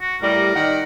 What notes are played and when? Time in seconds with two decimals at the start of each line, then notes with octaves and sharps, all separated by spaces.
0.01 F#4
0.22 A2 G3 A#4
0.55 D#3 F#5